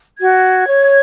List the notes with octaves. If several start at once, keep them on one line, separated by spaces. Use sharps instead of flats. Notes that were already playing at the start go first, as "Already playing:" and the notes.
F#4 G#6
C#5